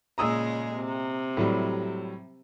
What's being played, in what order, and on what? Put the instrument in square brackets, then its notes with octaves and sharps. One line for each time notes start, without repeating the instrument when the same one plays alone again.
[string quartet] A#2 C#3 G#3 [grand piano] A#5 D#6 E6
[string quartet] C3
[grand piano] A2 F#3 G3